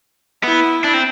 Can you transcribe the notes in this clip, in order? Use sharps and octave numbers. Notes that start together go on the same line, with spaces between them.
B3 E4
D4
C4